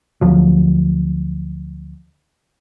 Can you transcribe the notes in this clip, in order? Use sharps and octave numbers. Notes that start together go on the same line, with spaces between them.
D2 F3 F#3